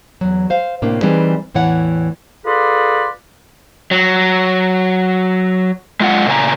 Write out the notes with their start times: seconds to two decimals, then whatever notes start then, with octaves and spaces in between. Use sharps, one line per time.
0.21 E2 F#3
0.50 C5 F5
0.82 A2 C3 A#3 C4 D4
1.02 E3 G3 C4 D#4 G#4 B4
1.54 E2 A2 E3 C#5 F#5
2.46 F4 G#4 A4 B4 D5 C6
3.91 F#3
6.00 G#3 F4 F#5
6.26 A#2 C#3 C#5 G#5 A#5